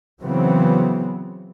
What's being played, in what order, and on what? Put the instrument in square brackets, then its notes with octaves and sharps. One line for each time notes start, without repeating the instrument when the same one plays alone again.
[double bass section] C#3 E3 F#3 B3 C4